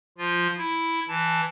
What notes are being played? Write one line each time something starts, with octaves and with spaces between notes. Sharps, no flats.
F3 F4
E4
E3 A5